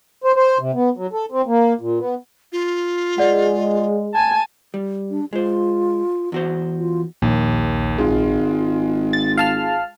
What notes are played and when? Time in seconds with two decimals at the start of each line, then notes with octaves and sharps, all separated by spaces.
0.24 C5
0.36 C5
0.59 C3
0.74 B3
0.97 F#3
1.13 A4
1.32 C4
1.47 A#3
1.81 A#2
1.99 B3
2.52 F4
3.18 G#3 D5 F#5
4.14 G#5 A5
4.74 G3
5.11 D4
5.33 G#3 F4 C5
6.32 E2 F#4 C5
6.79 F4
7.22 A#1 D#2
7.98 G#1 G#3 F4
9.13 A6
9.37 F5 A5 F6